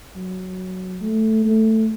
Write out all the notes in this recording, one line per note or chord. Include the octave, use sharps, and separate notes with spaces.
F#3
A3
A3